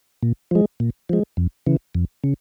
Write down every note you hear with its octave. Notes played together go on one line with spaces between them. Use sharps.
A#2
F3 G#3
A#2
F3 G#3
F2
C#3 E3
F2
C#3